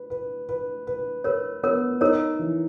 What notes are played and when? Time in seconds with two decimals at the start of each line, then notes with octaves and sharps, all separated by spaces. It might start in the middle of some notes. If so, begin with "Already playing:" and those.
Already playing: B4
0.10 B4
0.49 B4
0.87 B4
1.24 A#4 B4 C#5
1.63 B3 A#4 C#5
2.01 D#4 A#4 C#5
2.39 E3